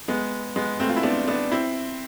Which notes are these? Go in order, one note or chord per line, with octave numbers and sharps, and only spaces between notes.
G#3 B3
G#3 B3
A3 C4
F4
E4
B3 D4
B3 D4
C4 E4